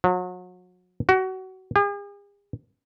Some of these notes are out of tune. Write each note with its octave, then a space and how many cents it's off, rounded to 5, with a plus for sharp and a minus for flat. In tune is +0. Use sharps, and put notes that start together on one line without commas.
F#3 -35
F#4 +25
G#4 -45